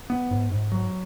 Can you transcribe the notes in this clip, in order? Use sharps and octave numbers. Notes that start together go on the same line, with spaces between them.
B3
G#2
G#2
F#3